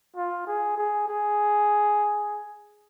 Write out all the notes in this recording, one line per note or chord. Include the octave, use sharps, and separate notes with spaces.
F4
G#4
G#4
G#4